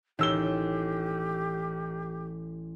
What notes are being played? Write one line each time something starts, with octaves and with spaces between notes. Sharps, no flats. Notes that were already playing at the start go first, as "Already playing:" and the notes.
A1 D#3 G4 E6 G7